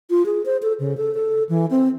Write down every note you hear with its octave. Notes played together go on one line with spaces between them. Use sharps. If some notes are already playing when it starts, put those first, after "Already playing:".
F4
G#4
C5
A4
C#3
A4
A4
E3
C4